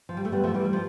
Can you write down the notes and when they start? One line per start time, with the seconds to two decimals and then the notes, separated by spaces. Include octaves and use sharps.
0.09 F3
0.17 G3
0.25 A3
0.32 G3 B3
0.44 F3 A3
0.54 E3 G3
0.65 G3
0.73 F3